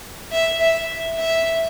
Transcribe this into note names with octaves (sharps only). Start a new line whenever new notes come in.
E5
E5
E5